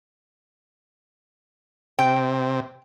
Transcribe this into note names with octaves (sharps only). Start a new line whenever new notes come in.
C3 G5